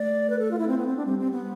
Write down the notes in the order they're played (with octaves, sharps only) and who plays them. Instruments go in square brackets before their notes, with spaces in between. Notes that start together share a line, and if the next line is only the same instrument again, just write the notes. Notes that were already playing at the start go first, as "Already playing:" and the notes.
Already playing: [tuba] A3 [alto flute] D5
[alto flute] B4
A4
F4
E4
C4
B3
C4
D4
[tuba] G3 [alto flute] C4
[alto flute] C4
B3